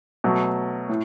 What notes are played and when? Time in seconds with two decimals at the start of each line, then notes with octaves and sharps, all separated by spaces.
0.24 B2 F#3 A3
0.89 A2